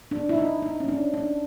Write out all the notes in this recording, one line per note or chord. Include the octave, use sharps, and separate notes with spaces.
D4
E4
D#4
D#4
C#4
D4
D4